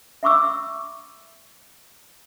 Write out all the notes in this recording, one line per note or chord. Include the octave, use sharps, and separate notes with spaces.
E5 F#5 B5 C#6 D6 E6